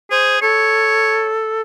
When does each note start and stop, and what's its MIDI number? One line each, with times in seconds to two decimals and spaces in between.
0.11 0.40 68
0.11 0.38 72
0.42 1.61 69
0.42 1.30 73